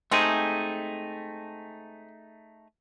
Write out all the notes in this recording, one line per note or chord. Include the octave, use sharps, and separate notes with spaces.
C3 G#3 A3 C4 D#4 G#4